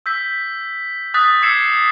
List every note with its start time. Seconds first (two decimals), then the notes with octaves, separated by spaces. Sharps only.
0.06 E6 G6 B6
1.14 D#6 F#6 A6 B6
1.42 D6 E6 G#6 C7 C#7 E7